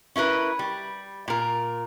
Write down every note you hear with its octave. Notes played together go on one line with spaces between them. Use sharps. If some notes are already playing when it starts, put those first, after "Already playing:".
C#4 E4 A#4 B4
G3
A#2 A#4